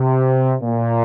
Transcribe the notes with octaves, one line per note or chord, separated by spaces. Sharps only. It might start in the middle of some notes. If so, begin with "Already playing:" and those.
Already playing: C3
A#2